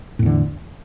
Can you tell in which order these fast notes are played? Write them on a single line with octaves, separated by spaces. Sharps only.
A2 E2 D3